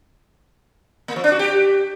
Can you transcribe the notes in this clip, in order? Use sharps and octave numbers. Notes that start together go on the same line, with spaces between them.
A#3
F3
D4
F#4
G4